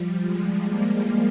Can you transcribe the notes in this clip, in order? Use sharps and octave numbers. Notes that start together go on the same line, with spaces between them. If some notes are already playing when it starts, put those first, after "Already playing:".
Already playing: F3 G3
G#3
A#3